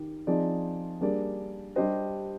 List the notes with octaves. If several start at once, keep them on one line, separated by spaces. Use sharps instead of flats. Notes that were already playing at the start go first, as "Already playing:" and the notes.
Already playing: D#3 G4
F3 C4 D#4 G#4 D5
G3 A#3 D4 G#4 D5
G3 D4 G4 C5 D#5